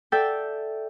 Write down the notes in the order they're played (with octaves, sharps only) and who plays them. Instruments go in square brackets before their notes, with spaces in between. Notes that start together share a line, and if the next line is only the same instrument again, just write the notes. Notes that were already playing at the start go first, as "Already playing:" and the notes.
[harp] A4 D5 E5 G5 G6